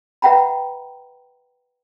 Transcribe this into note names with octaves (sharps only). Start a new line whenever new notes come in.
B4 E5 F#5 G5 A#5 B5